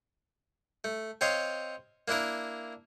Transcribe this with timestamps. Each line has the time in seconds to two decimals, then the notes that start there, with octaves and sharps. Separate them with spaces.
0.84 A3
1.21 C4 C#5 D#5 F5 C6
2.08 A#3 D4 E4 A#4